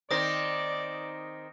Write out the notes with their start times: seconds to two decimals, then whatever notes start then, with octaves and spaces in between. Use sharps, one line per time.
0.11 D#3 C4 D5 D#6 A#6 C7